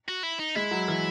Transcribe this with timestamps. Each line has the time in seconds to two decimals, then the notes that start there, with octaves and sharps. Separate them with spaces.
0.09 F#4
0.23 E4
0.39 D#4
0.55 G#3 E4
0.71 F#3
0.88 E3